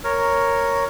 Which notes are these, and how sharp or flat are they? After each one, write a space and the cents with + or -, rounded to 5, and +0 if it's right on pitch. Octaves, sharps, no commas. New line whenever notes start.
A#4 +0 C#5 +0